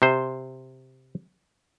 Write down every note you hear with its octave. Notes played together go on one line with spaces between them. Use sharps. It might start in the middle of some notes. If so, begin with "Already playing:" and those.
C3 C5